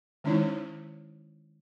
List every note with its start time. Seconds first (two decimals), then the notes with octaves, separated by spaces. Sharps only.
0.24 D#3 G#3 C#4 D#4 E4 C#5